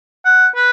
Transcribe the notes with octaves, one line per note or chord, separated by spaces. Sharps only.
F#5
B4